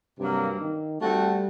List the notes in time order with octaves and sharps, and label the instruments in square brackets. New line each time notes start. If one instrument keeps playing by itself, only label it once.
[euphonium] G2 [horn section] C3 F#3 A#3
[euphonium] D#3
[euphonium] G3 [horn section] A3 C4 F#4